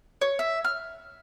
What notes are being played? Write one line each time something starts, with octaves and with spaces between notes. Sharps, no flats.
C#5
E5
F6